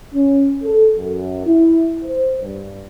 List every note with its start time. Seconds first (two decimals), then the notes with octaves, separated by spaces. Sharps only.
0.15 C#4
0.64 A4
0.97 F#2
1.47 E4
2.05 C5
2.42 G2